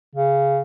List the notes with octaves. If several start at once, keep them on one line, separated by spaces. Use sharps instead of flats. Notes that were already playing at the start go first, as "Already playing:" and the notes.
C#3